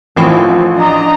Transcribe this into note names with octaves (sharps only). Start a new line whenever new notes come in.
A1 D#3 F3 C4 E4
D4 D#5 A#5